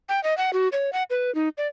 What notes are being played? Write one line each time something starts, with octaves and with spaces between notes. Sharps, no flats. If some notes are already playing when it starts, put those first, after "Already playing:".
G5
D#5
F#5
F#4
C#5
F#5
B4
D#4
D5